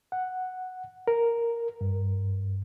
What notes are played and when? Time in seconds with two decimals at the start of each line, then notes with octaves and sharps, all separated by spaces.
0.12 F#5
1.08 A#4
1.81 G2